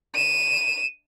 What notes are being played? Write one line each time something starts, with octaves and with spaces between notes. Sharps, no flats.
D#7 E7